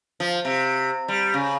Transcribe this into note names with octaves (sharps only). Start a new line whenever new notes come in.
F3
C3
G3
C#3